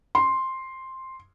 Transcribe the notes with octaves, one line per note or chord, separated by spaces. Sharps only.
C6